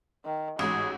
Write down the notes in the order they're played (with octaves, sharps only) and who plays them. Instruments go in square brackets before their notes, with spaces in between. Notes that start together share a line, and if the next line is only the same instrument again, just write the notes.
[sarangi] D#3
[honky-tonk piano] A1 G#2 [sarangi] F#4 [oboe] G#4